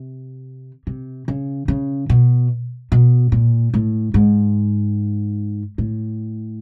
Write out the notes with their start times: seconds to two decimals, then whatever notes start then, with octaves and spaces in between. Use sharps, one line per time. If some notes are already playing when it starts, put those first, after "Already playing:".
Already playing: C3
0.87 C3
1.28 C#3
1.68 C#3
2.10 B2
2.92 B2
3.32 A#2
3.74 A2
4.14 G#2
5.78 A2